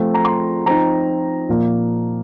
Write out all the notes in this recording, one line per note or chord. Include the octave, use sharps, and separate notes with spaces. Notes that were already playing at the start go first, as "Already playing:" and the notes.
Already playing: F3 A3 C4 F4
A#5
C6
F3 C4 D#4 A#5
A#2 F3 A#3